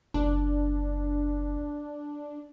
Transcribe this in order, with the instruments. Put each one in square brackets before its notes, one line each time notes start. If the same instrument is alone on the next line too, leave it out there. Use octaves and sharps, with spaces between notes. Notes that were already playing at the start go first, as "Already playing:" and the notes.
[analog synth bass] F#1 [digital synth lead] D4